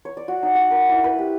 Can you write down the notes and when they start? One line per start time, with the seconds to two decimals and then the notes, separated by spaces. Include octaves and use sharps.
0.05 C#5
0.17 D5
0.28 F#4
0.43 D#4
0.55 F#5
0.71 A#4
0.89 E4
1.04 B4
1.19 G4